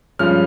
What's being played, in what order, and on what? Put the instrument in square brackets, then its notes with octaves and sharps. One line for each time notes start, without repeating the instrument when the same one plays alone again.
[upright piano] G2 F3 G#3 C#4 F6